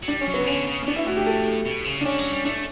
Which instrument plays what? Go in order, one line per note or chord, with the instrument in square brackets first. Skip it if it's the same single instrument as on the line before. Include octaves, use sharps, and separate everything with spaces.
[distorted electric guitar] F#3
[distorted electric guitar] G3 [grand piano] D4
[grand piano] C#4
[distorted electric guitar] F#3
[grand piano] B3
[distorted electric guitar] C#3
[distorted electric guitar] D3 [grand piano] C#4
[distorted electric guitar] C#3
A2
[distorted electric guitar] B2 [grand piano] D4
[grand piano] E4
[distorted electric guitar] A2 [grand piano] F#4
[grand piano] G4
A4
[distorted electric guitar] B2
C#3
[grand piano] D4
[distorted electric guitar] D3 [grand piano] C#4
[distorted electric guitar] F#3
G3
[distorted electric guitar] A3 [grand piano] D4